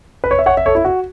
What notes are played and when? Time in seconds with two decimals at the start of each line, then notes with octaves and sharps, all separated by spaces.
0.24 B4
0.31 C#5
0.39 E5
0.46 C#5 F#5
0.57 E5
0.66 A4 C#5
0.75 E4
0.85 F#4